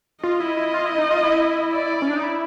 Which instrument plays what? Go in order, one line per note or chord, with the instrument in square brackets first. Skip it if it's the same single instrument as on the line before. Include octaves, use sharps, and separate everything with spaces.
[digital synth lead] F4 [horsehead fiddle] D#5
[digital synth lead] E4
E4
F4
E4
D#4
F4
E4
[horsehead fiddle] D5
[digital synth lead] C#4
D4
D#4
E4